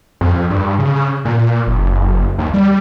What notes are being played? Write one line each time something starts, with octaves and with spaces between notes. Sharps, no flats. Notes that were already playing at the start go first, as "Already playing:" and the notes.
F2
G2
C#3
A#2
F#1
D#2
G3